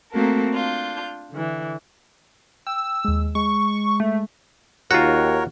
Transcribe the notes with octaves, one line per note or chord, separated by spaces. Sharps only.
A3 A#3 C4 F#4 A4 A#4
D4 F4 G6
D3 E3
G5 E6
D#2 G#3
G#3 C#6
A3
D#2 F4 F#4 A#4 C#5 F#5